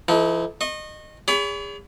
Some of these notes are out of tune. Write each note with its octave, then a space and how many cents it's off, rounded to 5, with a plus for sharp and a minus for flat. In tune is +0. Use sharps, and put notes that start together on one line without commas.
E3 +45 D#4 +40 A4 -5
D#5 -20 C#6 -35
G#4 -30 C#5 +45 B5 +20